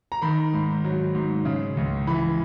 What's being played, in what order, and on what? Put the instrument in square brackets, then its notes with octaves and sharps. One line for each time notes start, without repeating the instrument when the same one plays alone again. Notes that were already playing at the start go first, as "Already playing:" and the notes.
[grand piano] A#5
D#3 B5
G#2
F#3
G#2
C#3
C#2
E3 B5